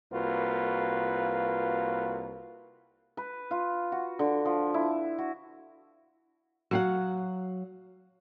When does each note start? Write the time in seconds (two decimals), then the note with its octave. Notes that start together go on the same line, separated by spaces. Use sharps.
0.12 C2 A#3 F4 F#4 B4
3.17 B4
3.51 F4
3.92 F#4
4.19 D3
4.45 F3
4.74 E4
5.18 F#4
6.71 F#3 F#4 F5 F#5